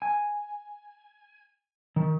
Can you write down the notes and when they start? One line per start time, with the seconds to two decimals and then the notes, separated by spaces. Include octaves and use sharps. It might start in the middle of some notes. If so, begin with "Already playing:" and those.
0.02 G#5
1.96 D#3